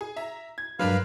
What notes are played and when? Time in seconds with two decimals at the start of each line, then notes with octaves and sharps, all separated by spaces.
0.01 G#4
0.16 E5 A#5
0.58 G#6
0.79 G2 F#3 G#3 D4 A#4 B4 F5 F6